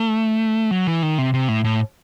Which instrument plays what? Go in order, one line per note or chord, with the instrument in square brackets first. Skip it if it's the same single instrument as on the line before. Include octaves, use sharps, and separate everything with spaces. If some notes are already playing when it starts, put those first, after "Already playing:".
Already playing: [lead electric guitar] A3
F#3
E3
D#3
C3
C3
A2
A2